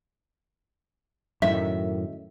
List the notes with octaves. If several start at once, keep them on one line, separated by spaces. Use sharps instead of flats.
F#2 A2 D#3 E5